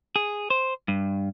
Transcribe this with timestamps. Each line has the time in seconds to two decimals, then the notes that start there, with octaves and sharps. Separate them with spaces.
0.16 G#4
0.50 C5
0.88 G2